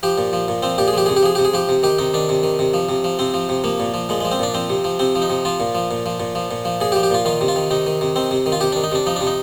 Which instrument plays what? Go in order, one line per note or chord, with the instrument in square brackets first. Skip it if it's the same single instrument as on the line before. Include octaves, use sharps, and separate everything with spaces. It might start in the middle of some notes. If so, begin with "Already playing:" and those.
[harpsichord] F3 G4
A#2
F3
A#2
F3 C4
A#2 G4
G#4
F3 G4
C3 G#4
G4
F3 G#4
C3 G4
G#4
F3 G4
C3
D#3 G4
C3 D#4
D#3 D4
C3
D#3
C3
F3
C3
F3
C3 C4
F3
C3
F3 A#3
A#2
F3
A#2 G#3
F3 G#3
C4
A#2 D4
F3 C4
C3
F3
C3 C4
F3
D#4
C3
F3 F4
A#2
F3
A#2
F3
A#2
F3
A#2
F3
A#2 G#4
G4
F3
G4
A#2 F4
D#3 F4
C3
F4
D#3
C3 D#4
D#3
C3
D#3 C4
C3
D#3
F4
C3 G4
D#3 D4
D#4
C3 D4
F3 D#4
C3 D4
D#4